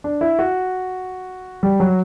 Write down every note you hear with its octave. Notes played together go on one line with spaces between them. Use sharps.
D4
E4
F#4
G3
F#3